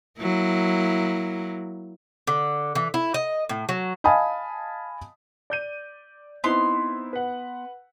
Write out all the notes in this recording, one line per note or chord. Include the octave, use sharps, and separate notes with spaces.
F#3 A#3 E4
D3
E3
E4
D#5
A2
F#3
D#5 F5 G#5 A5 B5 D#6
D5 G6 D#7
B3 C4 D#4 E4 C6
B4 F#5